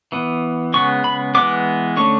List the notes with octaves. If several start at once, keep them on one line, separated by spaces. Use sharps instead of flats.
E3 B3
C#3 G#3 B3 C#6
B5
E3 G#3 B3 D6
D3 A3 C#4 C#6